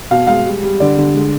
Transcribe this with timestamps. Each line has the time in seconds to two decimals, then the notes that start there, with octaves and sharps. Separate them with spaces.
0.11 B2 F5
0.27 G#3 F5
0.45 G3
0.63 G3
0.80 D3 D5
0.97 D3
1.15 G#3